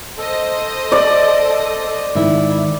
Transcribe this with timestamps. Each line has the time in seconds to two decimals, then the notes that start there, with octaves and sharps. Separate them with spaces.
0.18 A4 C5 D#5
0.92 D5
2.15 G#2 D#3 E4